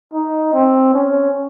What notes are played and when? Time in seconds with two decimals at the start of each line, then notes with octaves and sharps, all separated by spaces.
0.14 D#4
0.54 C4
0.94 C#4